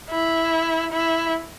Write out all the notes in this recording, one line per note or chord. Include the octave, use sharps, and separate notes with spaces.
E4
E4